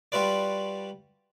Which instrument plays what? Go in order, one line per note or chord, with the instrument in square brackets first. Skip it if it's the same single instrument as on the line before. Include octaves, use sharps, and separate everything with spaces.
[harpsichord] G3 F4 F#4 B4 D5